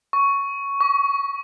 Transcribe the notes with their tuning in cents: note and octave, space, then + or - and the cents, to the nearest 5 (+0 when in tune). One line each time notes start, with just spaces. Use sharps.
C#6 +5
C#6 +35